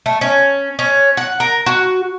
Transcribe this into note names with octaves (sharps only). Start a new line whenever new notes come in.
A3
C#4
C#4
F#5
A#4
F#4